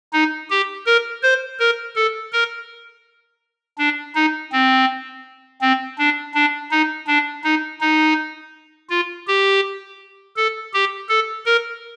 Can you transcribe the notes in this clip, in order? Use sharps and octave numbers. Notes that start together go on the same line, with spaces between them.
D#4
G4
A#4
C5
A#4
A4
A#4
D4
D#4
C4
C4
D4
D4
D#4
D4
D#4
D#4
F4
G4
A4
G4
A4
A#4